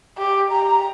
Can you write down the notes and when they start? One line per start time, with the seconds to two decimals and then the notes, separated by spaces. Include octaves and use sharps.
0.18 G4
0.52 A#5